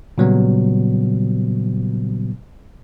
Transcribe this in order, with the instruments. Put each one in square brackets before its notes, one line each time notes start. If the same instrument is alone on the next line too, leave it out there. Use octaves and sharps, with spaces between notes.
[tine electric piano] A#2 C#3 F#3 G3 B3